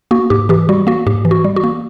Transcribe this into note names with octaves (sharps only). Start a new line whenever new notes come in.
A#3 F#4
G#2 G4
E3 G4
G3 F#4
A#3 F#4
G#2 G4
E3
F#4
G3
F#4
A#3